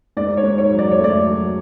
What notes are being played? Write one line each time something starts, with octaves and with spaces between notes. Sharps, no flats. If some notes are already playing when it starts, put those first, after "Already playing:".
G#2 D5
C#5
G#2
C#5
F#3
D5
C#5
A3 D5
F#3